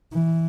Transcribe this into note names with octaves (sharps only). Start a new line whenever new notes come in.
E3